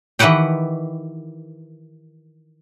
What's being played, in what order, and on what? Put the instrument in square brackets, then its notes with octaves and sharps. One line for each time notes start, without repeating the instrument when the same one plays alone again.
[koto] D#3 E3 G4 B4 F#5 G5